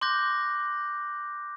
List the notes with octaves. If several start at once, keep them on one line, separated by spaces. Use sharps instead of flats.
C6 D6 F#6 G6 A#6